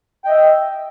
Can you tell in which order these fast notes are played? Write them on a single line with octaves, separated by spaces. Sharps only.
G5 D#5 E5